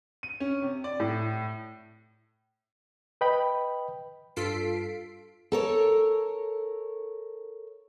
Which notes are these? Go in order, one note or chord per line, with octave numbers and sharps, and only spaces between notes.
D#7
C#4
C3
D5
A2
B4 D#5 G5 B5
G2 F4 A4 B6 C7 D7
A4 A#4 C#5